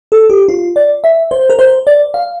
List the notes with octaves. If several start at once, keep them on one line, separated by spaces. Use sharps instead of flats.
A4
G4
F4
D5
E5
C5
A#4
C5
D5
F5